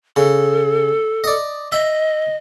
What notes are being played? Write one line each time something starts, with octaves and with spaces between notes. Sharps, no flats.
C#3 A4
D5 D#5
D#5 E5